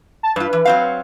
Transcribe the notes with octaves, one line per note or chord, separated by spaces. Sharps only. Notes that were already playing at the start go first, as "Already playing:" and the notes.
A5
G2 F4 B4
E3
F#3 C4 F5